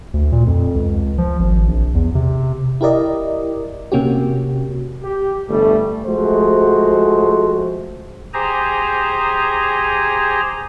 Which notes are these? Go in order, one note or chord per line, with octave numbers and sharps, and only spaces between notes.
D2
A#2
F2
C#2
F3
G#1
A#1
E2
C3
E4 G4 A#4 D5 D#5
C3 A#3 C#4 F#4 G4
G4
G1 E3 G3 A3
F3 G#3 A3 F#4 C5
G4 G#4 C5 G#5 A#5